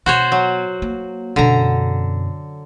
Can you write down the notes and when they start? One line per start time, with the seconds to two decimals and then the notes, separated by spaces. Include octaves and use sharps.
0.06 B2 F#4 C5 C#5
0.32 F#3
0.82 A#3
1.36 F#2 B2 D3 A#5